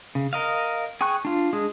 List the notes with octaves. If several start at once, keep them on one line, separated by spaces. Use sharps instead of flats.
C#3
A#4 D#5 F5
G#4 G5 G#5 C#6 F#6
D4 F4
G#3 D4 G#4